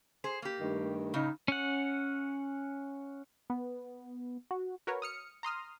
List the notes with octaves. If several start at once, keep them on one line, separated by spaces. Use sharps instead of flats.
G#4 C5
A#3 G4
G2 D#3 A3
A2 C#3 D#4
C#4 F#5
B3
F#4
F#4 A#4 B4 C#5
D#6 F6 C#7
A#5 C6 D#6 F6